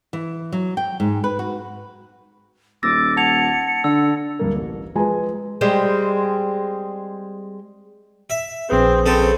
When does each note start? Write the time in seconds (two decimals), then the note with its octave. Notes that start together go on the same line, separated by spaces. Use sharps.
0.13 E3
0.52 F#3
0.77 G5
1.00 G#2
1.24 B4
1.39 F#4
2.83 D#1 D6 E6 A6 A#6
3.17 F#5 A5 G#6 A6 C#7 F7
3.84 D3 E6
4.39 D1 G2 A#3
4.56 A1
4.95 F3 G#3 B4 G#5 A#5
5.61 G3 G#3 C4
8.30 E5
8.70 A#1 C4 G#4 B4
9.06 C#3 C4 A4